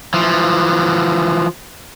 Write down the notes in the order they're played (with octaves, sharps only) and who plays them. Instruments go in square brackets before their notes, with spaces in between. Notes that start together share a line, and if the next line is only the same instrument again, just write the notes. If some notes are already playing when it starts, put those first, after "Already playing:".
[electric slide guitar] E3 F3